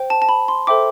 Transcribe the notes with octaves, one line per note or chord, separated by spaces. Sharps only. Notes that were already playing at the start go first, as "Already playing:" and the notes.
Already playing: C5 G5
A5
A5
B5
C6
A4 C5 E5 G5 D6